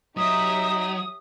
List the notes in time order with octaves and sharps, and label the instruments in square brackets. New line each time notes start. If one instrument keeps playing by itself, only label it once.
[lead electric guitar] F#3 [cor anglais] D#4 [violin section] G4 C#5 E5 [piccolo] D#6